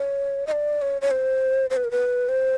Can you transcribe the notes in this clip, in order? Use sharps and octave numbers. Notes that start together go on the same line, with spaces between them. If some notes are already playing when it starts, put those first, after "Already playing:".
Already playing: C#5
D#5
D5
C#5
C#5
C5
C5
B4
A#4
B4
C5